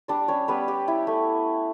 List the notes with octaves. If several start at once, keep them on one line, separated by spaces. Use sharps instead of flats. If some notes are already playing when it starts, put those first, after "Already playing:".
G3 D4 D5
G3 C#4 C#5
G3 B3 B4
G3 G4
E4
A3